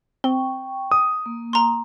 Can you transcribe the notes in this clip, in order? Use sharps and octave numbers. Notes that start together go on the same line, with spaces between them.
C4 G5 C#6 G7
D#6
A#3
A#5 C6